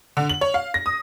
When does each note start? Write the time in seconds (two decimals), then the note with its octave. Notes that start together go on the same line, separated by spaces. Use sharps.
0.17 D3
0.29 F#7
0.41 C#5
0.54 F5
0.74 A#6
0.86 D#6